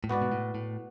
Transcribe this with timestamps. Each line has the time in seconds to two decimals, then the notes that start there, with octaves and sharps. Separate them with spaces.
0.04 A2
0.09 G#2 B3 F#4 B4 D5
0.22 B2
0.32 A2
0.55 A2